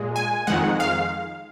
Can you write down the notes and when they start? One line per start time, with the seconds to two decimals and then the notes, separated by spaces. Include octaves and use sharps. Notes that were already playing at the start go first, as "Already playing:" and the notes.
Already playing: A#2 G#3
0.16 G#5
0.47 F2 D#3 G#3 F#5
0.80 F5